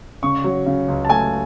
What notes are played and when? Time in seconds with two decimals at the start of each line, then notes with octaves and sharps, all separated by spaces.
0.23 C#3 C#6
0.44 F#3
0.66 C#3
0.88 C#2
1.05 A5
1.09 A3 G#5